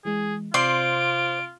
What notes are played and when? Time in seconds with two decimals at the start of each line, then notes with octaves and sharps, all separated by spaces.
0.05 E3 G#3 G#4
0.54 C3 F4 C5 D5 C6 D7